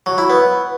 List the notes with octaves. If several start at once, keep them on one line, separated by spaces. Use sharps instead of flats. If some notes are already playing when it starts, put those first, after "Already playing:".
F#3
E4
B3